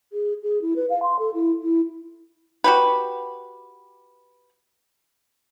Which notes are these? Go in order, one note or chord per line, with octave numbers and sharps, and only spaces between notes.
G#4
G#4
E4
B4
F5
C6
A4
E4
E4
F#4 G4 B4